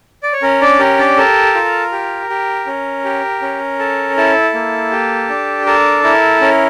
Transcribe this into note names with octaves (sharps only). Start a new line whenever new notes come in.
D5
C#5
C#4 A#4
D4 D5
G4 A#4
D4 D5
A4 A#4
F4
G4
G4
C#4
G4
C#4
A4
E4 A4
A#3
G4
D4
A4 A#4
E4 A#4
C#4 A#4